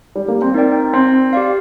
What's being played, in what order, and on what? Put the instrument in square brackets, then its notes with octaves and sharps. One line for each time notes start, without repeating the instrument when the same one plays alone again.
[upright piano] G3
A#3
C4
[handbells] D#4 A#4 D5 G5
[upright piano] C4
[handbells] G4 D5 F5